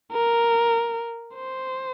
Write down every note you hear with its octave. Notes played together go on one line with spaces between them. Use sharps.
A#4
C5